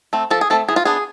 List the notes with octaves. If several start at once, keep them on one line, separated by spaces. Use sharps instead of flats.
A3 C4
F3 A4
G#4
A3 C4 A4
E3 G#4
F4
B3 D4 G#4